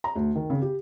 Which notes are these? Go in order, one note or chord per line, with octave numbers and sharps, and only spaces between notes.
A#5
D2
D#3
C#3
G4